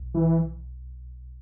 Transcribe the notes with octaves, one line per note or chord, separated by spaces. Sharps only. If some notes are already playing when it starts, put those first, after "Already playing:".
Already playing: B1
E3